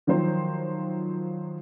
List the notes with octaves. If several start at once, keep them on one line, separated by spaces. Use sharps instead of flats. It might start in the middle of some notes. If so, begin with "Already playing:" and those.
D#3 F3 F#3 C5